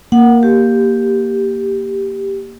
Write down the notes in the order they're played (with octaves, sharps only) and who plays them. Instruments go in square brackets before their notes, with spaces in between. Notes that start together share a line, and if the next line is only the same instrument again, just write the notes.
[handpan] A#3 [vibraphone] F#5
[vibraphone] G4